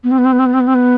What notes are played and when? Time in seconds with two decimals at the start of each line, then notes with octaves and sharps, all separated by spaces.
0.04 B3
0.11 C4
0.18 B3
0.25 C4
0.33 B3
0.39 C4
0.46 B3
0.54 C4
0.60 B3
0.67 C4
0.75 B3